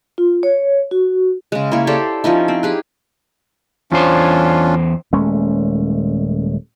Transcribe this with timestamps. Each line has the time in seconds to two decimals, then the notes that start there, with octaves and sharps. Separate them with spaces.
0.18 F4
0.43 C#5
0.91 F#4
1.52 C#3 G#3
1.71 A#3 E4 C#5
1.87 G4 A4 C5 D5
2.24 F3 C#4 D#4 E4
2.48 C4
2.63 G4 G#4 B4
3.92 E2 C#4 D4 F4 C5
5.13 D#1 G#3 A3 C#4